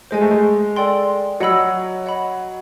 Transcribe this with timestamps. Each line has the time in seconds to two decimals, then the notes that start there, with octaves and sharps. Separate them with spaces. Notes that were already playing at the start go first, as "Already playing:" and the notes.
0.11 G#3 C5 D#5 G#5
0.21 A3
0.31 G#3
0.76 A4 D5 G5 C6
1.40 F#3 D#5 F#5 B5 E6
2.06 D#5 F#5 B5